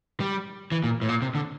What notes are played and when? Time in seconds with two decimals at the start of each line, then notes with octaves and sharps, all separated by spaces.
0.20 G3
0.72 E3
0.84 A#2
1.02 A2
1.09 A#2
1.22 C3
1.35 D3